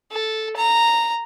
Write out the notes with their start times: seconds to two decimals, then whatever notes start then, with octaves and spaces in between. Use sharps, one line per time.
0.12 A4
0.57 A#5